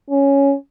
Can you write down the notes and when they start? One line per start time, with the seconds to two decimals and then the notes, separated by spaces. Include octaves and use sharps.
0.10 C#4